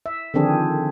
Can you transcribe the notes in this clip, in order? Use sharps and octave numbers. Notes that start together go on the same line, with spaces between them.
E5
D3 D#3 F3 C4 D4 G#4